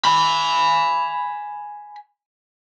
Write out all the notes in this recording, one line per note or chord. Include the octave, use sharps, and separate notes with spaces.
G#5 B5